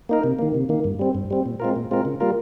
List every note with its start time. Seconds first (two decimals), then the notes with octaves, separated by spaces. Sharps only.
0.09 A#3 D#4 A#4
0.24 C3
0.39 D#3 A#3
0.54 C3
0.69 D#3 A#3
0.84 G2
0.99 G3 C4
1.15 G2
1.31 G3 C4
1.46 A#2
1.60 G#3 C4 F4 A#4
1.76 A#2
1.91 G#3 C4 F4 A#4
2.05 C#3
2.20 G3 A#3 F4 A#4